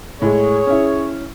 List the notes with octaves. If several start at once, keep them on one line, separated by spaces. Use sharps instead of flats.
A2 G#3 G#4 C#5
C#4 E4